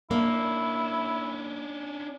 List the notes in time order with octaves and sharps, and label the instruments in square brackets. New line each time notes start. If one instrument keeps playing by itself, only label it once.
[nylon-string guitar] A#3 [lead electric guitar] C#4 D4 [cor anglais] E4